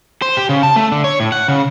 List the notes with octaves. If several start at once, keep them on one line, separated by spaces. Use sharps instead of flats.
C5
G4
C#3
A5
A3
D3
C#5
A2
F#5
C#3